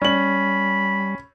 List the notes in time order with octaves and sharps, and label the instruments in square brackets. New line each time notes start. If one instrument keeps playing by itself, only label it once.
[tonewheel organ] G3 [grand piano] C#4 F#7 [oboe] B5